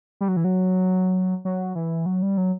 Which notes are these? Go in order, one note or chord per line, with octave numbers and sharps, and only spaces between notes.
G3
F#3
E3
F#3
F#3
E3
F#3
G3
F#3